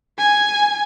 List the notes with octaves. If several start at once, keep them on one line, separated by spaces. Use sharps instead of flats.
G#5